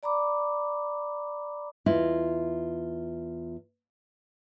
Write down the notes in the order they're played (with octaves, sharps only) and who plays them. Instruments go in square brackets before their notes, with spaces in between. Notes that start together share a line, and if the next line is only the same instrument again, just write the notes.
[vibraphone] D5 A#5 B5 D6
[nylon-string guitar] E2 E4 F4 D#5